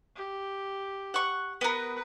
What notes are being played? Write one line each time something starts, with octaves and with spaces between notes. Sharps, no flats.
G4
F#5 C#6
B3 A#4 B4